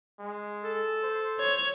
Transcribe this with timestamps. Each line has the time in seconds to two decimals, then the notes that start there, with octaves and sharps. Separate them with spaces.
0.19 G#3
0.64 A4
1.03 C5
1.40 C#5